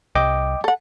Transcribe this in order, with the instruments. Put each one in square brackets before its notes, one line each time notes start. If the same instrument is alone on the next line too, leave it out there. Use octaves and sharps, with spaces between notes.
[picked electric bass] C2 [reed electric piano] D#5 G5 D6
[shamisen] A4 F#5